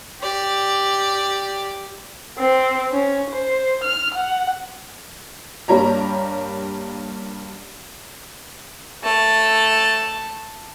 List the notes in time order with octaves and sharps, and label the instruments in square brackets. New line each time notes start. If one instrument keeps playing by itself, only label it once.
[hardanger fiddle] G4 D5
[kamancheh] C4
C#4
C5
F6
F#5
[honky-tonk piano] G2 G3 A#3 C#5 A#5
[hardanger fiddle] A3 A5